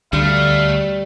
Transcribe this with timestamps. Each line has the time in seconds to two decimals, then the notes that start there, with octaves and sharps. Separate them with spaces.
0.13 D2 G3 A3 F5